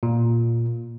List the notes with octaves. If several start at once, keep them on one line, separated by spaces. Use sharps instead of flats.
A#2